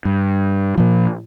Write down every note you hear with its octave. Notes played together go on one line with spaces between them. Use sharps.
G2
A#2 F3